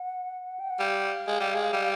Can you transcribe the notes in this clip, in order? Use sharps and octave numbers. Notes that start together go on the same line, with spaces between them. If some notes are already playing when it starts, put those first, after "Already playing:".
Already playing: F#5
G5
F#5
G3 F5
G#3
G3
G#3
G3